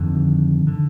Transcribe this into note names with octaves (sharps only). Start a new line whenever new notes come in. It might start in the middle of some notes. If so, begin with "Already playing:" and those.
Already playing: F2 D3 D#3
D3